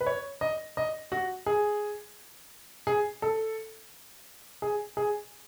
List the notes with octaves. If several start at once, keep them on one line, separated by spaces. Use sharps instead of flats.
B4
C#5
D#5
D#5
F#4
G#4
G#4
A4
G#4
G#4